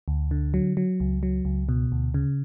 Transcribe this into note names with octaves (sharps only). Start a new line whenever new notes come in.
D2
D3
F#3
F#3
C#2
F#3
C#2
B2
D2
C#3